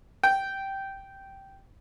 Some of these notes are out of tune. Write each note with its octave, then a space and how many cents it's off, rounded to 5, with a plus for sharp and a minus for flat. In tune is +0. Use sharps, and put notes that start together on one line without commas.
G5 -10